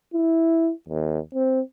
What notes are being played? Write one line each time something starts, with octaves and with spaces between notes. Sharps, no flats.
E4
D#2
C4